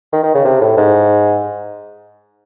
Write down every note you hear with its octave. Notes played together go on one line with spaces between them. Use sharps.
D#3
D#3
C#3
C3
A2
G#2